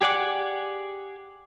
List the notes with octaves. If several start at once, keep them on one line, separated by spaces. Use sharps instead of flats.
G4 G#4 D5 F#5 D6